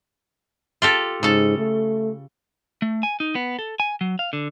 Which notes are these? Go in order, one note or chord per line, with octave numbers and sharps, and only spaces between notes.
F4 G4 A4
G#2 C#3 A4
A3
A3
G#5
D#4
B3
A4
G#5
F#3
F5
D3